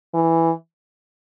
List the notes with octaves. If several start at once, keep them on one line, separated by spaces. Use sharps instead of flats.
E3